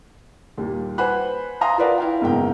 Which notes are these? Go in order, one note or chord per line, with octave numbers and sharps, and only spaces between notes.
D#2 A#2 G3
B4 C5 F#5 G#5 B5 F#6
E5 F5 G#5 A#5 C6 D#6
F4 A#4 B4 D5 F5 F#5
E4 F5 G5
F#1 G#2 B2 A#3 G5